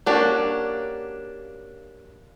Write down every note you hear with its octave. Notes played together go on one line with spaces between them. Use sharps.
A#3 C#4 D4 F#4 G4